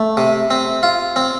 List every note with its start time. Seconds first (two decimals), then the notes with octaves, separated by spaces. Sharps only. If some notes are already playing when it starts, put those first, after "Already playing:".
Already playing: A3
0.17 C3
0.50 C4
0.83 F4
1.16 C4